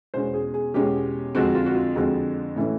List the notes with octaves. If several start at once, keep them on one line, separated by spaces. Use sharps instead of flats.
E2 B2 G#3 C#4 C5
G#4
G#4
E2 B2 G#3 C#4 G4
F2 D3 F3 G#3 C4 F#4
F4
F#4
F4
F2 D3 F3 G#3 C4 F#4
A2 E3 A3 C#4